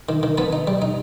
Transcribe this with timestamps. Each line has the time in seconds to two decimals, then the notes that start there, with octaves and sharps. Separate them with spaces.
0.09 D#3
0.23 D#3
0.38 B3 A5 B5
0.53 D#4
0.67 G3
0.82 D#4